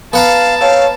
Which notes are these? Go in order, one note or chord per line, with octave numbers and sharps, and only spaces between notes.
B3 F5 F#5 A5 A#5
A4 C#5 F5 G5